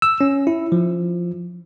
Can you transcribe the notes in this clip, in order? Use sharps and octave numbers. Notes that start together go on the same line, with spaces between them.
E6
C#4
E4
F3